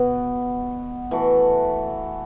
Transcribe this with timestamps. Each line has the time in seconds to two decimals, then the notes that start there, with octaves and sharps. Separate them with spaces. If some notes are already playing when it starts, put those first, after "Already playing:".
Already playing: B2 B3 F#4
1.11 E3 A3 F#4 A4